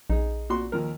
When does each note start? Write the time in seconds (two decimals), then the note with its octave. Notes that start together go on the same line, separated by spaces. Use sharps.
0.10 A#1 D#4 G#4
0.49 A#2 F#4 C6
0.72 D#2 F3 A#4